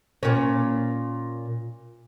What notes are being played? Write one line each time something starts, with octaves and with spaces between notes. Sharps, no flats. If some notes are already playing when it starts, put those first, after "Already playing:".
A#2 C#4